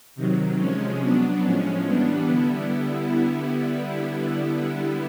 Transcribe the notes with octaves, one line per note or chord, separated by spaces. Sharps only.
C3 D#3 F#3
C3 F3 G#3 C#4
F#3 B3 D4
A2 F3 G#3 C#4
E3 G3 B3 D4
D3 G3 B3 E4